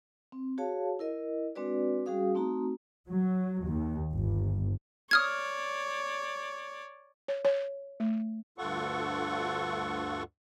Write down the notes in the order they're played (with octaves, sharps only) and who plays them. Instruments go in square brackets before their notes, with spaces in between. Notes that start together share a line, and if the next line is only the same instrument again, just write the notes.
[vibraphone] C4
F#4 G#4 C#5 F5 A5
E4 A#4 D#5
G#3 C4 D4 F#4 B4 D5
G3 C#4 F#4 G#4 F5 D#6
A3 C4 D#4 F#4 A#5
[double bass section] F#3
D#2
G1
[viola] C#5 D5 [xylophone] D#6 F6 G#6
[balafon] C#5
C#5
A3
[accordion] D2 G2 F4 A4 F#5 C#6